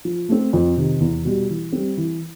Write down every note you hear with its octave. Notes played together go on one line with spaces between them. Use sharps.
F3
A3 C4
F2
C3 D#3
E2
B2 G3
E3
G3 C4
E3